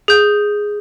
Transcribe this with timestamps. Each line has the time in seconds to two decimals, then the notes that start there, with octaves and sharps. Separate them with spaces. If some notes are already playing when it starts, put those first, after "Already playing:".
0.08 G#4 G6